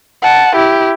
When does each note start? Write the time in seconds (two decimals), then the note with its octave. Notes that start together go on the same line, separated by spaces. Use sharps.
0.22 F#5 A5
0.55 E4 G4